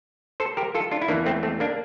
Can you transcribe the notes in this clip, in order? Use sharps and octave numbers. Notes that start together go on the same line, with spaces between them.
A4 C5
G4 A#4
F4 A4
D4 F4
E4
E2 E3 A#3 D4
A3 C4
A3 C4
A#3 D4